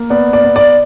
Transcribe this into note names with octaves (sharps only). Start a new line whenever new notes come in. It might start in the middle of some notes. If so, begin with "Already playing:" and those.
Already playing: A#3
B3 D5
D5
B3
D5